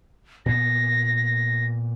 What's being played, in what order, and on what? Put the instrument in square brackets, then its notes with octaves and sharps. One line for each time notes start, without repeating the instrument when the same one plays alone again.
[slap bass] A#2 B3 [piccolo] A#6